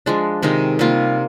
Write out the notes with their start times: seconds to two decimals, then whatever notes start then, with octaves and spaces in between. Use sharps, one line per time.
0.06 F3 G#3 D4
0.42 C3 D#3 G#3 D#4
0.79 C3 G3 A#3 F4